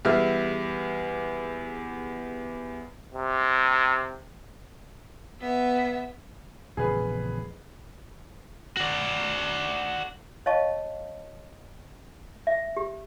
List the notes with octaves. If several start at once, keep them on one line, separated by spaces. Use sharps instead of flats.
E2 G3 G#4 E5 F6
C3
B3 E5
A#1 E2 C#3 G#4 B4
F#4 D5
C#5 D#5 F5 A5 C#6
E5
G4